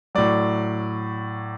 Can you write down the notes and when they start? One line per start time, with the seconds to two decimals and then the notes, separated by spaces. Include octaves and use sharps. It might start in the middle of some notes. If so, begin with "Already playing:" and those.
0.15 A2 F#3 D5